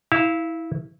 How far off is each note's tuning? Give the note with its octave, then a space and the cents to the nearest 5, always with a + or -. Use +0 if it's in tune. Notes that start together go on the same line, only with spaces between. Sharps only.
E4 -20 F5 -25